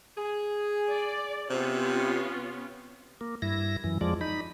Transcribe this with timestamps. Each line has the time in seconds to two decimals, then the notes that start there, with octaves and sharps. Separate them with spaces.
0.18 G#4
0.88 D5
1.50 C3 B3 C#4 F4
3.21 A#3
3.42 G2 E4 A#6
3.84 F#2 E3
4.01 F2 F3 G#3 D5
4.21 D#4 B5